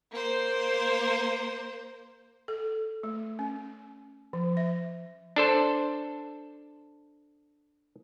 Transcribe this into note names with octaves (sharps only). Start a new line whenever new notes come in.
A#3 C5
A4
A3
C#4
F3
E5
D4 A4 C5